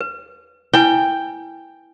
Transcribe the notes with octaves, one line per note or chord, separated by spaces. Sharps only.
B4
E4 B4 G5 G#5